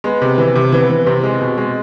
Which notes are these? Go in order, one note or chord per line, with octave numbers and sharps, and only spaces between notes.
G#3 B3
C3
E3
C3
E3 B3
E3
C3 C4
G#3
B2
G#3